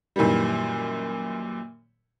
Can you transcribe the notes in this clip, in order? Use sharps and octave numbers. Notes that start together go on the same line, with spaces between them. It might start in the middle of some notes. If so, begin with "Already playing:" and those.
F#2 A#2 D#3 E3 G3